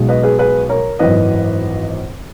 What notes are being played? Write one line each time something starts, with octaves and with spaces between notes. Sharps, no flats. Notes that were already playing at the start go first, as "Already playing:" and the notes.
Already playing: B1 B2 G#3
B4 D#5
G#4 B4
G#4 B4
A#4 C#5
G#1 F#2 E3 B4 D#5